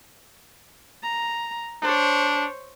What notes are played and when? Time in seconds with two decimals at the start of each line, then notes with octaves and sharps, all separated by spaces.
1.03 A#5
1.82 D4 C5 C#5